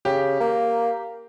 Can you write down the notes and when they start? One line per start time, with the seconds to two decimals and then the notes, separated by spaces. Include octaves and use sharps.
0.05 C#3 G4
0.40 A#3